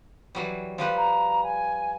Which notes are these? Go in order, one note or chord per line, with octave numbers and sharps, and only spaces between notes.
E3 F#3 G3
F3 G3 B4
A#5
G#5